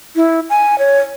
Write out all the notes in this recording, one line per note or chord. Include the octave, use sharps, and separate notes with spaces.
E4
G#5
C#5